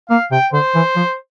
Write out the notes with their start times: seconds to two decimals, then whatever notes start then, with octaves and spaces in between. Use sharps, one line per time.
0.10 A#3 F5
0.31 C3 G5
0.53 D3 C5
0.75 E3
0.96 F3